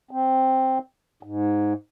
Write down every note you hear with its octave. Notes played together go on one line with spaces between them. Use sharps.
C4
G#2